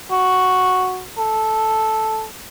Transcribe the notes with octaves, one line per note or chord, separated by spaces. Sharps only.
F#4
A4